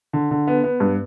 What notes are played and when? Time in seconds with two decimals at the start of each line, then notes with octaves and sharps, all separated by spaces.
0.13 D3
0.31 D3
0.47 B3
0.64 B3
0.80 G2